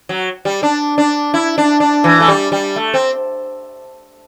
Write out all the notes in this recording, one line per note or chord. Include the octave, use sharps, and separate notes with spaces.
F#3
G3
D4
D4
E4
D4
D4
E3
A3
G3
G3
A3
C4